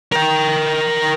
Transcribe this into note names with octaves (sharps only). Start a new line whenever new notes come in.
A#4 G5